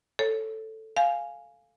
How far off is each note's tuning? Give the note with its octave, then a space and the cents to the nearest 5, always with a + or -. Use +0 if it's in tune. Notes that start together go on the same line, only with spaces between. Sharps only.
A4 +0 C#5 +0
F5 +0 G#5 +0